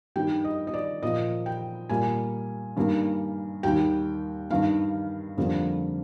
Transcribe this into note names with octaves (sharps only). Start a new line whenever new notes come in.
G2 D#3 G3 G5
D#5
D#5
D5
A#2 F3 A#3 D#5
G5
A#2 G3 A#3 G#5
G2 D#3 G3 A#3
D#2 D#3 G3 G5
G2 D#3 G3 F5
F2 D3 G3 A#3